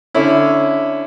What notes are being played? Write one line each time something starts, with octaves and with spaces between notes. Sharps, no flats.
D3 C#4 E4